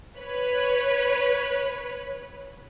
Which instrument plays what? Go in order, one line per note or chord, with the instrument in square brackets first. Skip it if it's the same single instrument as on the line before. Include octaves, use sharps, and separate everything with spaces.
[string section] B4 C#5